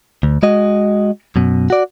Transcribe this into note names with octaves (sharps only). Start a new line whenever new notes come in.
D2
G#3 F#4 D#5
F#2 B2
F#4 D5